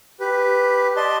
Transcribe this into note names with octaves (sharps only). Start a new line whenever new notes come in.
G4 B4
D5 D#5 A5 C6